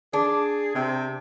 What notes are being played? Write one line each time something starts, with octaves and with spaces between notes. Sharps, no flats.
D4 G#4
C3